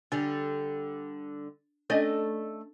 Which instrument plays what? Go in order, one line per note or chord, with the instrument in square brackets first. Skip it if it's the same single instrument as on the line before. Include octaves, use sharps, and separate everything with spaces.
[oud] D3 G3 [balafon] D4
[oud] A3 D5 D#5 [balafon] C#4 D4 A4